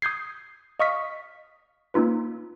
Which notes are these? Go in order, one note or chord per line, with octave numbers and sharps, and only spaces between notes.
D#6 G6 G#6 C7
D#5 F5 C#6 D#6 F6 B6
A#3 C#4 D#4 F4 B4